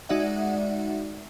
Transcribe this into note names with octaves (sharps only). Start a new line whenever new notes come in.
G#3 D#4 F#4 D5 E5 F#5